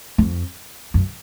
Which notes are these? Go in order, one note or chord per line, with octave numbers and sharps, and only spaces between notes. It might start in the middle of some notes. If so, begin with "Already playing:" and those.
F2
F#2